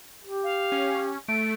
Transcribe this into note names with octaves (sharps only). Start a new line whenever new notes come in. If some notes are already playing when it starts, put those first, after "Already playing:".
G4
F5
C#4
A3 D7